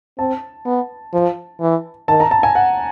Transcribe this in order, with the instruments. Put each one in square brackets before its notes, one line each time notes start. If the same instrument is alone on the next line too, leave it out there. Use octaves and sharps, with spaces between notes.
[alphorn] C4 [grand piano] A5
[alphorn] B3
F3
E3
[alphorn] D#3 [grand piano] A5
[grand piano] A#5
A5
G#5
F#5